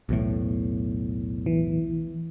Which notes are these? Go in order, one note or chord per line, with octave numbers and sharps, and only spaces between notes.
B1 E2 A2
E3